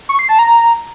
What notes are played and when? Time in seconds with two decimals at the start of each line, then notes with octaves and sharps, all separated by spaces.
0.09 C#6
0.19 C7
0.29 A5
0.39 A#5